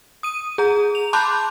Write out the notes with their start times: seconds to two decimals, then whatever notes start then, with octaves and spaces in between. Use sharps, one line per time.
0.23 D#6 D#7
0.58 G#4 A#5
0.95 F7
1.13 A5 B5 C6 D6 F#6 G6